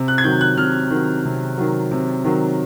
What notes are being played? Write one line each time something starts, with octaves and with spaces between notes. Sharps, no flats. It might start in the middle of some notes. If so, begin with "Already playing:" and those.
Already playing: C3
F#6
G#6
D#3 F#3 G6
F#6
C3 F6
D#3 F#3
C3
D#3 F#3
C3
D#3 F#3